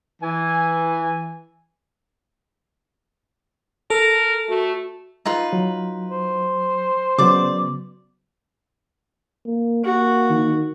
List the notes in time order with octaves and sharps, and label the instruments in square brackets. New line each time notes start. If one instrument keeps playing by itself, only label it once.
[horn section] E3 G#5
[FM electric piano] A4 [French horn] A#4
[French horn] A3 [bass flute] F#4
[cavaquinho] D#4 F4 B4
[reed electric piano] F#3
[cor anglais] C5
[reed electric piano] C#3 F#3 B3 [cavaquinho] D5 D6
[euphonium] A#3
[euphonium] A#3 [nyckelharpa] F#4
[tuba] D#3